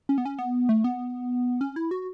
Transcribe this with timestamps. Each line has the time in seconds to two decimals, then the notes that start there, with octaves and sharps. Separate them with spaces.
0.09 C#4
0.18 B3
0.25 C#4
0.39 B3
0.69 A3
0.84 B3
1.61 C#4
1.76 E4
1.91 F#4